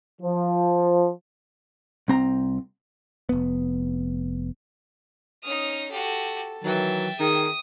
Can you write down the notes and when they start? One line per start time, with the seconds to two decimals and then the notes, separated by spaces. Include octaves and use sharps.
0.22 F3
2.08 C2 C4 A#5
3.29 F1 B3
5.44 C#4 D#4 D#6 F6
5.92 F#4 G4 A4
6.64 D#3 E3 F#3 E5 G5 A6
7.20 D#3 G#4 D#6